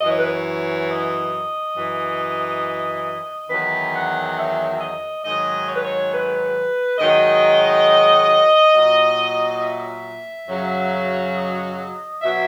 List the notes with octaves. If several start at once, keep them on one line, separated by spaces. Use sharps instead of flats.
F#2 E3 C#5 D#5
B4
C#5
D#5
F#2 E3
E2 D#3 F#3 B4
F#5
E5
D#5
G#2 D#3 F#3 D#5
C#5
B4
C#5
B4
G#2 D#3 F#3 D#5
A#2 F#3
E5
F#2 C#3 F#3
D#5
B2 F#3 E5